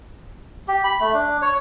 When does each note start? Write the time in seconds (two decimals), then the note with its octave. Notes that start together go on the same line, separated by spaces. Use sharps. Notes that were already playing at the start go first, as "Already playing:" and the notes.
0.68 G4
0.84 B5
1.00 A3
1.14 D4
1.42 C#5